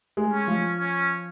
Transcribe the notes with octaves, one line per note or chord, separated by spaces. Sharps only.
G#3
C#4
F3
C#4